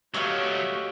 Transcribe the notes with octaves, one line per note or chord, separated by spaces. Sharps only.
F#3 A3 F#4 G4 C#5 D#5 F5